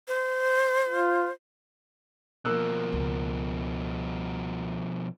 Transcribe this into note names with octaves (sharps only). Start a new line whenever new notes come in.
C5
F4
B2 F3 A#3 E6 F#6
C#2